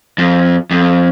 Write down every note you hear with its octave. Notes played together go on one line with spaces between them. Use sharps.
F2
F2